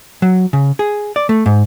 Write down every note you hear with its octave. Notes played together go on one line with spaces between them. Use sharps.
F#3
C#3
G#4
D5
A3
G#2